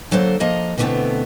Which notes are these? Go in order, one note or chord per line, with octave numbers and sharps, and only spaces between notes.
D3 F#3 A#3 A4 C5
F3 A#3 D#5 A#5
B2 D3 E3 A3 B3 C4